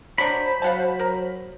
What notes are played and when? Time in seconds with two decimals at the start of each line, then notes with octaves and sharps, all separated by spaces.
0.18 F#3 D4 C5 B5
0.62 F#3 F5 F#5 A5
0.99 A#4